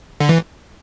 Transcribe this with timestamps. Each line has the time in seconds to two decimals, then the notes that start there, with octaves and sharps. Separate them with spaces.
0.20 D3
0.29 E3